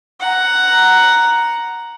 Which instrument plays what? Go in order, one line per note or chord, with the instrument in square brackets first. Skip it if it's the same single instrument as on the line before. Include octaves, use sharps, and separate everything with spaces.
[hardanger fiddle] F#5 A#5